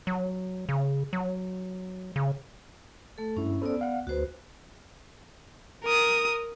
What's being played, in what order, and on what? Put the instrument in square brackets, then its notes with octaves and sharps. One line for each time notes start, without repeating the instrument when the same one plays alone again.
[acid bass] F#3
C#3
F#3
C#3
[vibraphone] A3 A4
[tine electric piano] G2 E4 [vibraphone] C#4
[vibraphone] B3 D5 [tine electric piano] C#4 A4 C5
[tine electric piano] F5 F#5
[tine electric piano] D2 B4 [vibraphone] F#4 C5
[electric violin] A#4 D#6